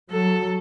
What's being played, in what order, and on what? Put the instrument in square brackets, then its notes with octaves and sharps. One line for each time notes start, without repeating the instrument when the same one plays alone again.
[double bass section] F#3 [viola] A4